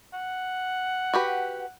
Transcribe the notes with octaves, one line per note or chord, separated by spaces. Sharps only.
F#5
F#4 G4 B4